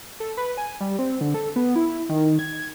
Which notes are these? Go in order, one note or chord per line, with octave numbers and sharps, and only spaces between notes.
A4
B4
G#5
G3
C4
D3
A4
B3
E4
D#3
G#6